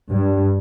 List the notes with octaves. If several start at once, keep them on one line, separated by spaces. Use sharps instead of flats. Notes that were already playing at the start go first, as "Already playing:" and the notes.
G2